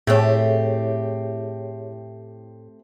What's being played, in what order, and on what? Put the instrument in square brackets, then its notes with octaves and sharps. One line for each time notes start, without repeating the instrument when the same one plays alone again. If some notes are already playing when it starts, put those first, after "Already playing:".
[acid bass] A2 [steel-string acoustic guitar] A3 C4 G4 [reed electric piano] G#4 C#5